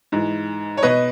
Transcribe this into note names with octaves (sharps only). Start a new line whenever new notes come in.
G#2 E3
C#5
B2 B4 D#5